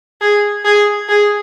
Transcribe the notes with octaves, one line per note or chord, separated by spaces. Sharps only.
G#4
G#4
G#4